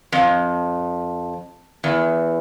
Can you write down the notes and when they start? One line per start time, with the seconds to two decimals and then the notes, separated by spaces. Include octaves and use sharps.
0.12 F2
1.84 E2